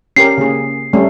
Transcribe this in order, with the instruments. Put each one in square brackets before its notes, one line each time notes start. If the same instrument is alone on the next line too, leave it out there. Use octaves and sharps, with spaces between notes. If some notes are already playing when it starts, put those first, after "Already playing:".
[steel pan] C#4 G4 A#4 [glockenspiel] C7
[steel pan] C#3 A#3 G#4
G3 A3 C#4